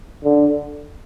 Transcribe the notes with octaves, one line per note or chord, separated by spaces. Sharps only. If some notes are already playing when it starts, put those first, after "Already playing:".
D3